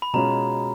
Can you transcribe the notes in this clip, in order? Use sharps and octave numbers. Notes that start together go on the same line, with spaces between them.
B5
B2 G#3 C#4 F4 A#5